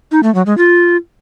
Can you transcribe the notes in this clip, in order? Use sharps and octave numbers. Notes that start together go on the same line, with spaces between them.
D#4
A3
F#3
G#3
F4